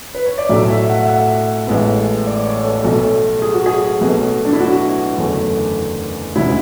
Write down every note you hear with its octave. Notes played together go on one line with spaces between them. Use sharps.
B4
C#5
D5
B1 A2 F#3 A3 E5
E5
F#5
E5
F#5
A1 A2 G#3 B3
D5
C#5
A4
B1 B2 A3 A4
G#4
F#4
G#4
B1 B2 A3
D4
E4
F#4
F#1 E2 D3 A3
E1 D2 C#3 G#3 E4